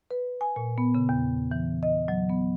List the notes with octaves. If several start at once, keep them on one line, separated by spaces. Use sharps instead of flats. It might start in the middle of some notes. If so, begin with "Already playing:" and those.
B4
G#5
A#2
B3
C#3
E2
E3
D#5
F#3
B3